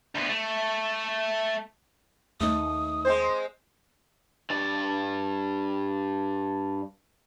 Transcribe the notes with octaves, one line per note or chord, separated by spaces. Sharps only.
D2 B3
A3
D#2 A3 D#4 D#6
G#3 C4 C5
G2 D5